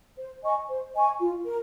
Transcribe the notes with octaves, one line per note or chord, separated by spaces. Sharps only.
C5
D#5 G#5 C#6
C5
D#5 G#5 C#6
F4
A#4